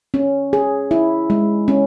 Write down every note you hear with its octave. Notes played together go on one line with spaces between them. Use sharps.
C#4
G#4
E4
G#3
C#4